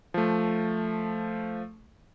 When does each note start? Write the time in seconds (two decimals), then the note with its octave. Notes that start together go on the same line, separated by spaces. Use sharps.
0.14 F3 A3